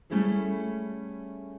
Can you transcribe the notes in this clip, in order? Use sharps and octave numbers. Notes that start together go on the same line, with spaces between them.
G3 A3 C#4 E4 G#4 A4